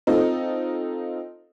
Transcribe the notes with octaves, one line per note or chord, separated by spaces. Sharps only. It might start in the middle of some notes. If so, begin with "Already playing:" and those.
C4 D#4 F4 A4